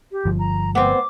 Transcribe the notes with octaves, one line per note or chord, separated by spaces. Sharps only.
G4
G1 F3
A#5
B3 C4 D6